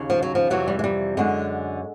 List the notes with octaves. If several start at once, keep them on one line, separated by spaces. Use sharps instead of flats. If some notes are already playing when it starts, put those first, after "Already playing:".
Already playing: D#2 C#3
F3
F#3
F3
F2 C3 E3 F#3
G3
G#3
G3
F#2 D3 G#3